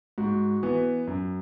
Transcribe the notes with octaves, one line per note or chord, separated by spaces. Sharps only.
G#2 F#4
E3 B3
F#2